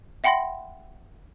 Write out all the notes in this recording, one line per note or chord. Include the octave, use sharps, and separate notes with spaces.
E5 F#5 G5 B5 C6 A#6